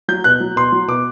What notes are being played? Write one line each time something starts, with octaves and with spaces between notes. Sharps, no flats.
F#3 G6
B2 F#6
F#3
B2 C6
F#3
B2 D6